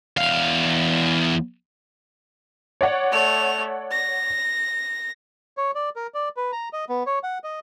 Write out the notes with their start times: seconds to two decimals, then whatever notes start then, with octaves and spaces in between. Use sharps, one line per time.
0.17 E2 F5
2.81 C#5 D5 F#5
3.12 A3 F7
3.91 A#6
5.57 C#5
5.75 D5
5.96 A#4
6.14 D5
6.37 B4
6.52 A#5
6.73 D#5
6.89 B3
7.06 C#5
7.23 F#5
7.44 D#5